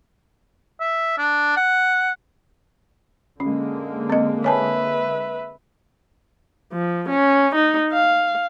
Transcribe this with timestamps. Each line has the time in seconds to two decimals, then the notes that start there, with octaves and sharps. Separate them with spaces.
0.80 E5
1.18 D4
1.57 F#5
3.40 D3 G#3 A#3 C#4
4.10 C4 D#5
4.44 B4 C#5 E5 G#5 A5
6.73 F3
7.09 C#4
7.55 D#4
7.93 F5